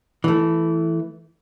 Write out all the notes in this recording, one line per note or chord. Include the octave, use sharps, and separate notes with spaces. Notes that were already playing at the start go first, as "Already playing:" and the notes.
E3 A3